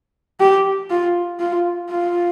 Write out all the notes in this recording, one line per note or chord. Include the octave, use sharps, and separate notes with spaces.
G4
F4
F4
F4